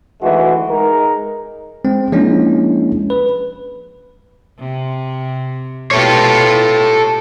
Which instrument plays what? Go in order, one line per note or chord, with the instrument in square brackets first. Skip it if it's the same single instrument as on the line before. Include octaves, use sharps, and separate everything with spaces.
[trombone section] D2 D#3 E3 G#3 F#4
G#3 D#4 G#4 A#4
[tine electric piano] G#3 C4
F3 G#3 A#3 C#4 D4 E4
B4
[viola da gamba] C3
[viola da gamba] B2 F4 G4 [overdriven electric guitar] A4 C#5